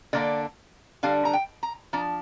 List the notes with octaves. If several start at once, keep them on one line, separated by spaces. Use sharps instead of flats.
D3 A#3 D4 D5
D3 G3 D4 F5
A#5
G5
A#5
F3 D4 A#5